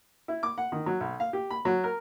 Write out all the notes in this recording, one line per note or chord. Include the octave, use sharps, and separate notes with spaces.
E4
D6
F#5
D#3
F#3
B1
F5
G4
B5
F#3
A#4